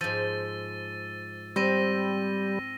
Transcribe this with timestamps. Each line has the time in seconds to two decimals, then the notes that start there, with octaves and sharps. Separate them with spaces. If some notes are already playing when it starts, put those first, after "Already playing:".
0.01 G#2 F3 E6 A6 D#7
1.56 G3 C4 E6 A#6 D#7